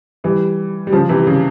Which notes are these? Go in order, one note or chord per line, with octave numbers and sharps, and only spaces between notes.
E3 G3
G3
C#3 F3
C3 E3
C#3